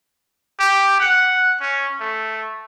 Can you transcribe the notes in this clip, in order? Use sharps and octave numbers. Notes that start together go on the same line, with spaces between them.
G4
F#5
C#4
A3